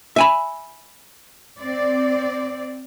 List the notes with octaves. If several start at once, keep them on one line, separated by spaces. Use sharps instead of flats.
E5 G#5 B5
C4 D5